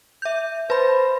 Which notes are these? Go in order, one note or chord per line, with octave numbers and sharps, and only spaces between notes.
E5 G6
B4 C5 B5